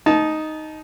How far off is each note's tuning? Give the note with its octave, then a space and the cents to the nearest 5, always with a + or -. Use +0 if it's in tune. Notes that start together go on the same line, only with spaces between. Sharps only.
D#4 +0 A5 -25